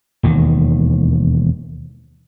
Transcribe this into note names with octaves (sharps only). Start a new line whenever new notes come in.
E1 D#2 D#3